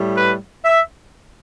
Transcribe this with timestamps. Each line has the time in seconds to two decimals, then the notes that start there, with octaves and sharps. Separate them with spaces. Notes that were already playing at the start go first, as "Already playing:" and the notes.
Already playing: A2 G3
0.14 B4
0.64 E5